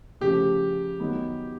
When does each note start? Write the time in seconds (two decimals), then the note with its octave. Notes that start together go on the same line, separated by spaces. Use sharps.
0.21 C#3 F3 A3 G4
1.00 D#3 F#3 B3 D#4